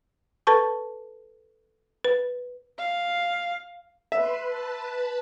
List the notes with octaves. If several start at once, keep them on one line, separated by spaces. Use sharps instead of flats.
A4 B4 A5 C#6
B4
F5
B4 E5 C6
B4 A5 B5